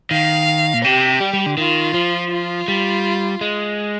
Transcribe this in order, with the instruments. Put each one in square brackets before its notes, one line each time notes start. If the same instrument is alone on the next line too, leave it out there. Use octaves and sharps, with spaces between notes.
[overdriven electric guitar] D#3 [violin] F5
[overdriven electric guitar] A#2
[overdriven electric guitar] C3 [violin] G4
[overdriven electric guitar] G3
G3
D3
[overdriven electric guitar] D#3 [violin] F4
[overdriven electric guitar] F3
[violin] F4
[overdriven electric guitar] G3
G#3